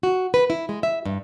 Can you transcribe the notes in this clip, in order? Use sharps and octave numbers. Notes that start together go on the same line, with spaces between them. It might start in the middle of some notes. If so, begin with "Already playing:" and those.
F#4
B4
E4
G#3
E5
G2